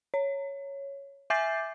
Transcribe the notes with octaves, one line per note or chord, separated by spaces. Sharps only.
C#5
E5 G#5 D6 G6 A6 C7